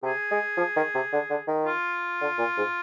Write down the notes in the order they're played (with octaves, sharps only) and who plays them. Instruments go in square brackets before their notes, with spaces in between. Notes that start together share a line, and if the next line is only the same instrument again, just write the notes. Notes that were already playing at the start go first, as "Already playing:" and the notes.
[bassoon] C3 [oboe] G#4
[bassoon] G#3
F3
D#3
C3
D3
D3
D#3
[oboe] F4
[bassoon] D3
A#2
G#2